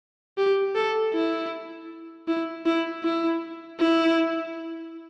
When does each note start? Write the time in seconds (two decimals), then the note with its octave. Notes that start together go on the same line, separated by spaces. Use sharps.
0.38 G4
0.75 A4
1.14 E4
2.28 E4
2.66 E4
3.04 E4
3.80 E4